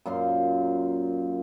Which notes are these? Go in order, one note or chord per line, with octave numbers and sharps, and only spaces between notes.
F#2 A#2 C5 C6